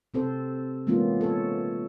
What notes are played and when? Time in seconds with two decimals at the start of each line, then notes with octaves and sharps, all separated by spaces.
0.14 C3 C4 A4 C5
0.87 E3 G#3 A#3 B3 C#4 F4
1.21 A4 C#5